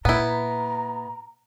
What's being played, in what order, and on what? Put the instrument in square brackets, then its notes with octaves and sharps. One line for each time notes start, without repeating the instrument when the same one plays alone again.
[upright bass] A#2 [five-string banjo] B3 E4 [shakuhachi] A#5